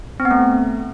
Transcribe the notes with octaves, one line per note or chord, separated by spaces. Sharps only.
C4
B3
A3